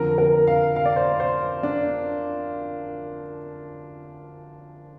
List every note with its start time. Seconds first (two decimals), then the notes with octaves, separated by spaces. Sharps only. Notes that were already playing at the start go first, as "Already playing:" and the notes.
Already playing: F2 D3 F3 A#4
0.18 A#4
0.47 F5
0.76 F5
0.85 D5
0.96 C5
1.06 D5
1.20 C5
1.63 D4